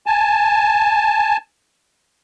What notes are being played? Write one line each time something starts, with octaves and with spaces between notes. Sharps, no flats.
G#5 A5